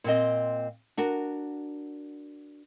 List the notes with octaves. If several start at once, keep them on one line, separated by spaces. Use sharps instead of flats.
A#2 C4 D#5
D4 F#4 A#4